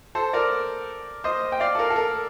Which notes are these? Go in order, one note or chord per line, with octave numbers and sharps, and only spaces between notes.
A4 C5
A#4 D5
C5 D#5
G5
D5 F5
A4
A#4
A4
A#4